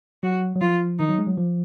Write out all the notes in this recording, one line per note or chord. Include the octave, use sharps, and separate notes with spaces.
F#3 F#4
F#3
F3 F4
D#3 D#4
F#3
G#3
F#3
F3